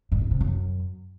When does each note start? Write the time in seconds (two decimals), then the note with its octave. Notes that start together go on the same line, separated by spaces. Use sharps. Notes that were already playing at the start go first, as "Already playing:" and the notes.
0.12 G2
0.21 G#2
0.31 C3
0.41 F#2